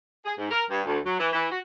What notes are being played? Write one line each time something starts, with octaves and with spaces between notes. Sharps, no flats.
G#4
G#2
A#4
G2
D2
F#3
E3
E3
F#4